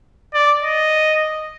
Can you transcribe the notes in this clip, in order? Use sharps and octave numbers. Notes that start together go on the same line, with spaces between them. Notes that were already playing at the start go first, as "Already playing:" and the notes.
D5
D#5